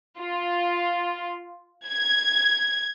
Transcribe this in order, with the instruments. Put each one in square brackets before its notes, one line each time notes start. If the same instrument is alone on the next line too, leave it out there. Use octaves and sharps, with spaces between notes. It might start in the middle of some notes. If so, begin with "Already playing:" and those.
[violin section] F4
G#6